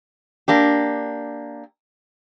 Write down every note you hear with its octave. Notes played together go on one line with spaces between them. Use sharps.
A#3 D4 G4